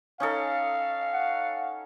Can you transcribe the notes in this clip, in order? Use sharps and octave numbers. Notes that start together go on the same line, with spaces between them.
C#4 D#4 A4 F5
F#5